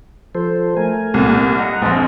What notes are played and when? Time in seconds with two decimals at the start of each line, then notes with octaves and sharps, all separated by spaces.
0.35 F3 A4 C5
0.77 A3 A#4 G#5
1.14 C2 A#2
1.59 D#5 F#5 A#5
1.82 A#1 F2 C4